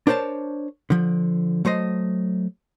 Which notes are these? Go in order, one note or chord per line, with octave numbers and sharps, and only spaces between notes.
D4 A#4 C5 C#5 A5
D3 F3
F#3 A3 C5 D#5